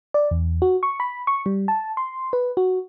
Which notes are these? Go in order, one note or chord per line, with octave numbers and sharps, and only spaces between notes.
D5
E2
F#4
C#6
B5
C#6
G3
A5
C6
B4
F#4